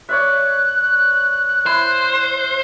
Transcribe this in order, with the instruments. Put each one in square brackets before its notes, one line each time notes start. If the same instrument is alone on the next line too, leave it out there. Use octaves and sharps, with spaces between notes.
[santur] C#5 D5 E5 [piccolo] F#6
[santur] E4 [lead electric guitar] C5